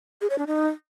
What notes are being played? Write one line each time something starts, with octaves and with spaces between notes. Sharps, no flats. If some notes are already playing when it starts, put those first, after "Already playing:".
G#4
C#5
D4
D#4